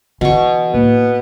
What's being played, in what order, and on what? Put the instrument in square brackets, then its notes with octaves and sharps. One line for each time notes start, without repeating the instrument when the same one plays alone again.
[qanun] B2 C#6 [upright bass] E3 F4
[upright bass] A2 A#3 [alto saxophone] B3